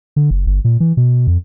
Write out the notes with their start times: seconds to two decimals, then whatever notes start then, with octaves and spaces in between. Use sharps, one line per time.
0.16 D3
0.30 F#1
0.46 G1
0.64 A#2
0.80 E3
0.97 B2
1.27 F2